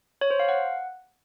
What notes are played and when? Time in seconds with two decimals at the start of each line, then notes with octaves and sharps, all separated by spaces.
0.21 C#5
0.30 C5
0.40 F5
0.49 F#5